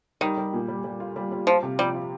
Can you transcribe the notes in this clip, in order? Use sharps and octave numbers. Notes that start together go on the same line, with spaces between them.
D#3 G3
G3
A#2
G3
G3
F4
G3
G3
F3 F4
C3
F3 G3
F4